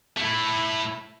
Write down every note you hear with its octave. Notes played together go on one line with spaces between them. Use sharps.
A3 E4